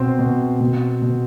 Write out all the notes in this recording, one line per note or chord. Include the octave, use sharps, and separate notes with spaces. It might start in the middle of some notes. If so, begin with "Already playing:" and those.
Already playing: B2 C4 C5
B2
B2
B2